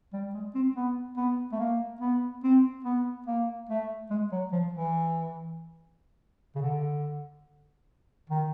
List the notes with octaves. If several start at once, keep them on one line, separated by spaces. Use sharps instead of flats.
G3
G#3
C4
B3
B3
A3
A#3
B3
C4
B3
A#3
A3
G#3
F#3
F3
E3
C#3
D3
D#3